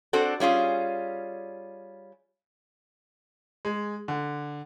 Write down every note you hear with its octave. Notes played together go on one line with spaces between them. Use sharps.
C4 D4 F#4 A4
G3 C#4 F4 G#4
G#3
D3